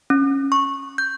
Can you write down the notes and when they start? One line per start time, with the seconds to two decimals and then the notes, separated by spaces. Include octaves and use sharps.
0.10 C#4
0.52 C#6
0.98 G6